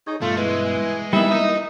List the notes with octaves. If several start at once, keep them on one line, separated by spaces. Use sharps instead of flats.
D#4 G#4 C#5
G2 B2 A3 F4
E3 G#3
G3 A#3 B3 D#4 E4 E5
D#5 A#5 D#6